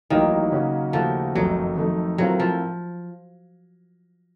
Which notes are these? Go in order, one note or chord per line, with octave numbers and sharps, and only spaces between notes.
A1 A2 D#3 F#3 A#3
C#3 F#3 A#3 C#4 F#4
D#2 C#3 F3 A3 D#4 F#4
F#1 F2 D#3 F#3 A3 D#4
F2 D#3 A3 D#4 A4
A2 F#3 A3 C4 F4 A#4
F3